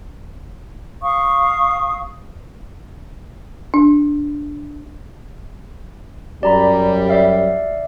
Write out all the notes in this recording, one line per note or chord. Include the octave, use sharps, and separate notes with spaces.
F5 C#6 D#6
D4
F#2 G3 D5 A#5 B5
D5 E5 F5